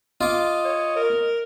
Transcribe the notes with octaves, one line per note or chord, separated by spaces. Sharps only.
F4 D#5 D6
C#5
A#4